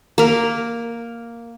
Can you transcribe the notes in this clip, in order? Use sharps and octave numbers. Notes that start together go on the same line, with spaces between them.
A#3 A#4